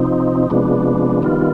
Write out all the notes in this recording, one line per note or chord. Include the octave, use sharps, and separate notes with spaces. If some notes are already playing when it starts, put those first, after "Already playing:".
Already playing: C3 F3 C4 D#4
C3 F3 G#3 B3 D4
D#3 G3 B3 F4